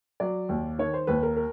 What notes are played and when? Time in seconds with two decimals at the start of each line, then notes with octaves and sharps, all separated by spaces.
0.20 F#3 D5
0.49 D#2
0.79 D#3 C#5
0.94 C5
1.07 D#2 B4
1.23 A#4
1.37 A#4